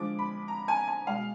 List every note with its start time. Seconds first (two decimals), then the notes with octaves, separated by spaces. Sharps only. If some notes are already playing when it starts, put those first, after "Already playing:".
Already playing: D3 F3 G#3 D6
0.19 B5
0.48 A#5
0.68 G#5
0.88 G#5
1.07 B2 G#3 F5